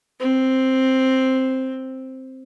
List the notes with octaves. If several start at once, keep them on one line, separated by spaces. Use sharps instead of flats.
C4